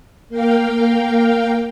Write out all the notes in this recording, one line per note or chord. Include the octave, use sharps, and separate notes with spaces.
A#3 A#4 F5 G5